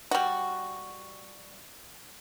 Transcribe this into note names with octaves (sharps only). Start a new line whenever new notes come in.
G3 F#4